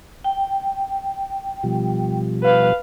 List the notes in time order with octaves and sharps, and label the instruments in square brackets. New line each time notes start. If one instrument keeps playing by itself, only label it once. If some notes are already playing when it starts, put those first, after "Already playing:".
[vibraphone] G5
[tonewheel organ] B2 F3 G3
[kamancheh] B4 F5